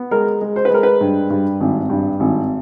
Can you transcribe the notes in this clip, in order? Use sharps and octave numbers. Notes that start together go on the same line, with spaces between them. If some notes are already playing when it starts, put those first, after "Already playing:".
Already playing: B3
G#3 A#4
G#3
C5
B4
G#3 A#4
B4
G2
G2
G#1
G2
G#1